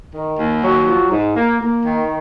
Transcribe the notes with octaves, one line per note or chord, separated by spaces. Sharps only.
D#3
D#2
F#3
F3
G#2
A#3
A#3
D#3